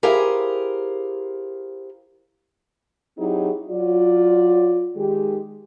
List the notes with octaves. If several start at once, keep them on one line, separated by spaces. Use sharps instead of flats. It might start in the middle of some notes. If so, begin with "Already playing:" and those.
E4 G4 G#4 A#4 C5 F5
F#3 C4 D#4 E4 G4 G#4
F#3 F4 D5
D#3 G#3 G4